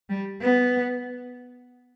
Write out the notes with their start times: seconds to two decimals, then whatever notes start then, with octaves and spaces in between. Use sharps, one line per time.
0.09 G3
0.42 B3